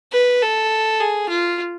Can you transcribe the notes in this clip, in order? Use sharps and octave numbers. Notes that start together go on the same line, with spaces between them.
B4
A4
G#4
F4